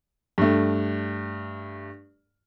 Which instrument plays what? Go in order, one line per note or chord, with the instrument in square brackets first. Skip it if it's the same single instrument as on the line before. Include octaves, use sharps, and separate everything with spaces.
[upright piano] G2 A3